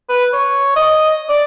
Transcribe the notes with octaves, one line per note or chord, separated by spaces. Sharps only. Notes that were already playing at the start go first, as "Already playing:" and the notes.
B4
C#5
D#5
D5